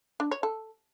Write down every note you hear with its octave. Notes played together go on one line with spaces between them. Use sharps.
D4
C#5
A4